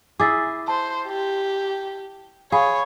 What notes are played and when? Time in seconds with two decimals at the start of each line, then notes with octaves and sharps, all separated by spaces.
0.20 E4 G#4 D6 A6 C7
0.68 C5 A5
1.08 G4
2.52 G#4 C#5 F5 B5